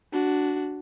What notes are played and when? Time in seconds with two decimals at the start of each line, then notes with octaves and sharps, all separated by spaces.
0.13 D4 F#4